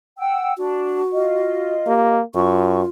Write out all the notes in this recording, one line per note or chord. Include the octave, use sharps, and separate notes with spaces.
F#5 G5 E6
D4 F#4
F4 D#5
A#3 G4
F#2 F4 C#6